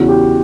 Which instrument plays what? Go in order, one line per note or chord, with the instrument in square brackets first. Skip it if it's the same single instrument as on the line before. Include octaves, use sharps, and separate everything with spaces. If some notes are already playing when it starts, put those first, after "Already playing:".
Already playing: [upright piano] E2 C#3 E3 F#4
G4